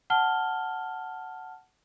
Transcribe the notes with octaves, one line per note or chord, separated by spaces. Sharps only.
F#5 A5 F6 G7